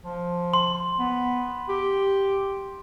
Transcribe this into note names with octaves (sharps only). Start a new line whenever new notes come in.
F3
C6
B3
G4